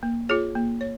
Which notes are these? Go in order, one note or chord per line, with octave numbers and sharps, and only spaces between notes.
A#3
F4 G#4 C#5
A#3
C#5